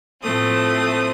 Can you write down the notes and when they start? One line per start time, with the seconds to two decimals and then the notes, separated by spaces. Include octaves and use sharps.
0.21 A2 F3 A3 C4 D#6